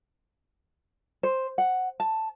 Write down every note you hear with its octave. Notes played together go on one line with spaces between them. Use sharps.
C5
F#5
A5